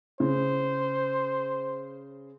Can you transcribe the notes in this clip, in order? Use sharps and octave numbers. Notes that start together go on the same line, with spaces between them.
C#3 C5